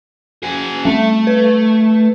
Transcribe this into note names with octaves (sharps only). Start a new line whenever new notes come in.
F#4 G#4
G3 A3 C4
B4